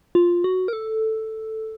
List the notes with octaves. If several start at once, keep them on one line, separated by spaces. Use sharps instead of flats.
F4
F#4
A#4
A4